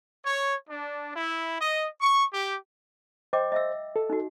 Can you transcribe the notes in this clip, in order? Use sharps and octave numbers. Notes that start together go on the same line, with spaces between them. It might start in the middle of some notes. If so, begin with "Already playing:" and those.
C#5
D4
E4
D#5
C#6
G4
C5 D#5 G5 D6
D#5 E5 E6
A4
D#4 F#4